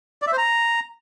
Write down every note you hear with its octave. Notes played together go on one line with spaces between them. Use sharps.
D5
E5
C5
A#5